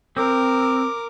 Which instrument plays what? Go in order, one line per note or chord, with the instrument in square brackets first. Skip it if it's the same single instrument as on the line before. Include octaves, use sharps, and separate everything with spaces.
[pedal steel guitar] C4 [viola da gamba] A#4 [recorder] D6